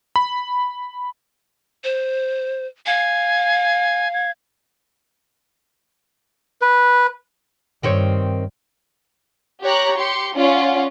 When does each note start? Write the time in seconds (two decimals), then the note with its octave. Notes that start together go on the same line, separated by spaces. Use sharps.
0.16 B5
1.84 C5
2.86 F5 G#5
4.14 G#6
6.62 B4
7.83 G2 D#3 C4 C#5
9.62 G4 C#5 A#5 F#6
9.97 G4 C6 C#7
10.35 C#4 F4 D5 F#5